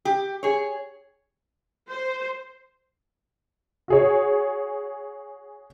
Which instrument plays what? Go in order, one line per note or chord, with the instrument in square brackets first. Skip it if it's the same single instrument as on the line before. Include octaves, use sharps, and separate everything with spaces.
[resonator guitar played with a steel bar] G4
G#4 C#5
[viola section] C5
[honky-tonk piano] F#4 G#4 C#5